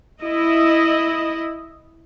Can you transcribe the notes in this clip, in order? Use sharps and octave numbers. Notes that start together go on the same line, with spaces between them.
E4 D#5